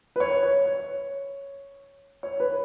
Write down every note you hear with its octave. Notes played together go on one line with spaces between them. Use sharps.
B4
C#5
C#5
C#5
C#5
B4